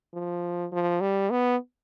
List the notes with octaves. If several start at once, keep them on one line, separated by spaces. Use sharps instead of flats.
F3
F3
G3
B3